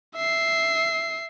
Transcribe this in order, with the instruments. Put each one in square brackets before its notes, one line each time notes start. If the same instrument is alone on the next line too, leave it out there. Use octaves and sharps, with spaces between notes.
[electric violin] E5 C7